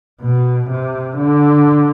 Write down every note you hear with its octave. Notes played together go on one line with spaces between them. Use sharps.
B2
C3
D3